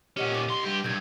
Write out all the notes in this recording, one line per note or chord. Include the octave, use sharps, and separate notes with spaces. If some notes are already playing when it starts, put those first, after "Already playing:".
A#2 C#4 G4 D#5 F#5
D6 D#7
C2 C6
G2 G4
B1 G2 G6 G#6